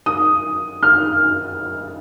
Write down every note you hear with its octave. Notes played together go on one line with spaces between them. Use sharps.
D#6
F6